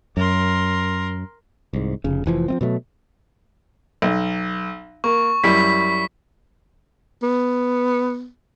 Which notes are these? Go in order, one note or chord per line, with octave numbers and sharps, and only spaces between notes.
F#2 A#4 C6
C2 G#2
F1 C#3
F1 E3 F3
F3 A3 C4
B2 F#3 G#3 A3
B1
A#3 C#6
F#2 G3 E4 B6
B3